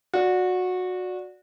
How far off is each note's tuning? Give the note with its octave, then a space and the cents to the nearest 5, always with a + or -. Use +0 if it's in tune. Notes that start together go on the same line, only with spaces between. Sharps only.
F#4 -20 D5 -5